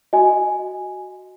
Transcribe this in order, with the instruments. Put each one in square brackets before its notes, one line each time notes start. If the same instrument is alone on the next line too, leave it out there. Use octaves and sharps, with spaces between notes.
[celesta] F#4 D#5 G#5